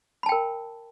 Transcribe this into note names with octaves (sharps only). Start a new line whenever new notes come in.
A#4 G5 A5 B5